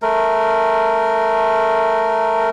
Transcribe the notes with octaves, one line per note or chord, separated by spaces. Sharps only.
A3 A#4